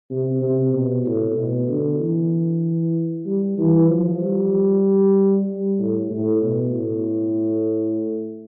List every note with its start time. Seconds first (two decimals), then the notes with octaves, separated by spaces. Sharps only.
0.10 C3
0.42 C3
0.73 B2
1.05 A2
1.36 B2
1.69 D3
2.00 E3
3.25 G3
3.58 E3
3.89 F3
4.21 G3
5.79 A2
6.10 A2
6.42 B2
6.73 A2